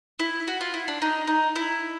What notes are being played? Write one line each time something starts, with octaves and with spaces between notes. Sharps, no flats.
E4
F#4
F4
E4
D4
D#4
D#4
E4